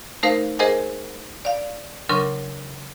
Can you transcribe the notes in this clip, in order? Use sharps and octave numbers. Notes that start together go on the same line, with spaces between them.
A3 D#4 A#4 C5 F5
G#4 A#4 C5 D#5 F#5 G#5
D5 F5
C#3 F#3 D4 A#4 C6 C#6